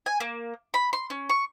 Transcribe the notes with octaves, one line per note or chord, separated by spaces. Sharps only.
G#5
A#3
B5
C6
C#4
C#6